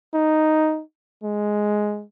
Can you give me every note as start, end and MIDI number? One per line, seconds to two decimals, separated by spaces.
0.14 0.82 63
1.23 2.04 56